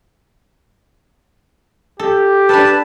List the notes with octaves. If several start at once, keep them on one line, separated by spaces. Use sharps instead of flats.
G4 A4
D4 A4 B4 A5